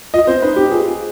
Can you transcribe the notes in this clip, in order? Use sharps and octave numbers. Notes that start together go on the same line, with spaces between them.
F4 D#5
C4 C5
D#4 B4
G4
F4 G#4